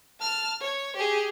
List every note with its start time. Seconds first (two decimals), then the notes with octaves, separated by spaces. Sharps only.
0.20 A5 F6
0.61 C#5
0.96 G4 G#4